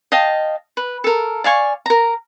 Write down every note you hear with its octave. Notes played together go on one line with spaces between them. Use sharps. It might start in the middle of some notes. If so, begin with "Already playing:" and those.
D#5 F5 G5 A5
B4
A4 A#4
D5 F5 G#5 C#6
A#4 A#5